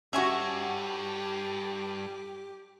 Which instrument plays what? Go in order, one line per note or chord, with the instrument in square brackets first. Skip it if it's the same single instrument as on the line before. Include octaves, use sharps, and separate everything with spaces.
[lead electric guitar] G2 [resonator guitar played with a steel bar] C#4 F#4 [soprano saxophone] G4 [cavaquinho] E5 G#5 C#6